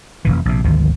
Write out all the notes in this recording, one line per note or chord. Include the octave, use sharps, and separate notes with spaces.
F1 C#2 E3
A#1 C3
G#1 D2 D#3 F3